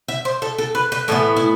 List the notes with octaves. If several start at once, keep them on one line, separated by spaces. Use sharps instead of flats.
E5
C5
A4
A4
B4
B4
A2 E3 B3 A4
E4